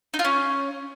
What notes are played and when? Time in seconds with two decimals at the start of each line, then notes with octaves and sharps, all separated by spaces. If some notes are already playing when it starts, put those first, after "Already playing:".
0.14 D#4
0.19 F4
0.25 C#4